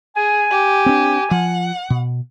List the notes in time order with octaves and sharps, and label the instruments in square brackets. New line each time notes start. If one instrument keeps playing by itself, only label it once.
[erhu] G#4 [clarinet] G#5
[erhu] G4
[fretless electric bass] C4 D4
[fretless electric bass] F3 [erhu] F#5
[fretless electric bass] B2